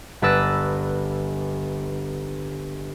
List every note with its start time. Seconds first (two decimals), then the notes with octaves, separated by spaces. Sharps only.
0.22 G1 B4 D5 E6 F#6 A#6